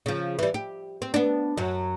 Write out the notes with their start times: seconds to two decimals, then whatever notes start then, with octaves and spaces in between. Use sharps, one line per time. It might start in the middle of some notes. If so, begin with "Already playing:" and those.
0.06 C#3 F3
0.39 E3 G3
0.54 G4
1.02 C4
1.14 B3 D4
1.57 F#2 F#3